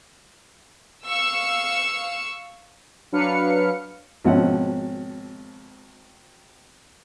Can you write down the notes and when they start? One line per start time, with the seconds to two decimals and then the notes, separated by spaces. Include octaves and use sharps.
1.07 F5 C#6 E6
3.12 F#3 D4 B4 F5 F6 C#7
4.24 G#1 B2 F3 C#4 E5 F#5